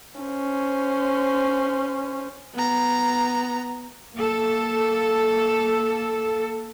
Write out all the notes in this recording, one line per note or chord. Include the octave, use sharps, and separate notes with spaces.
C#4 C5
B3 A#5
A#3 A4